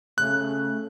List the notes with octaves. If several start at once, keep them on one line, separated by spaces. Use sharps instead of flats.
C#3 A3 F#6